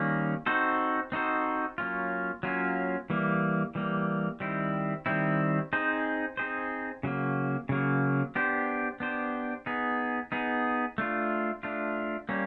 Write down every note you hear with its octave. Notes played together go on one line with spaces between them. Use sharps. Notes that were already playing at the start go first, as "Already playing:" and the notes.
Already playing: D#3 G3 A#3 C#4
C4 D#4 F#4 A4 C5
C4 D#4 F#4 A4 C5
F#3 A#3 C#4 F4
F#3 A#3 C#4 F4
E3 G3 A#3
E3 G3 A#3
D#3 G3 C4 E4
D#3 G3 C4 E4
C4 D#4 G#4 C5
C4 D#4 G#4 C5
C#3 F#3 A#3
C#3 F#3 A#3
B3 D4 G4 C5
B3 D4 G4 C5
B3 D#4 G#4
B3 D#4 G#4
A3 D4 F4
A3 D4 F4
G3 A#3 C#4